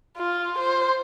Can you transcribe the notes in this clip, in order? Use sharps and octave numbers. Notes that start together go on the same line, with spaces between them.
F4
C5